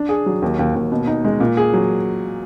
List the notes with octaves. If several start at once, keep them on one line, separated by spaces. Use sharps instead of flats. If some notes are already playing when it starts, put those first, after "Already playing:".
Already playing: D4
G#4
F#3
D#2
D#2
D#2
B2
D#4
G#3
A#2
G#4
F#3